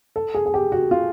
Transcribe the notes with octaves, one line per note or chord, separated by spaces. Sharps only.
A4
G#4
G#4
G4
F#4
F4